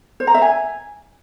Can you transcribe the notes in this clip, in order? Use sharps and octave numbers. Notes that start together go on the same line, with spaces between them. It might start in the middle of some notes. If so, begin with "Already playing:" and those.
C5
A#5
E5
G#5